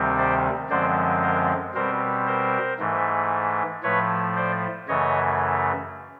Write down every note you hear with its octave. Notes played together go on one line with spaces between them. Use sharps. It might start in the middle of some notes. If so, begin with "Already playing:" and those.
Already playing: D2 C3 D#3 G3 C4
C5 D5
F#2 D3 F3 G#3 C4 C5 D5
A#4 C5
B2 G3 C4 A#4 C5
A#4 C5
G#2 E3 A3
A2 F3 A3 B4 C#5
C5 D5
F#2 C#3 E3 A3 C#5 D#5